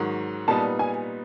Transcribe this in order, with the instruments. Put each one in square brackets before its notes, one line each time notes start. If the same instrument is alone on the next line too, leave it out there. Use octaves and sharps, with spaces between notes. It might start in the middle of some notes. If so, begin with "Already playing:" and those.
Already playing: [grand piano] G#2 D#3 F#3
[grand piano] A#2 G3 B3 D#4 [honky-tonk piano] A5
[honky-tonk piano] G#5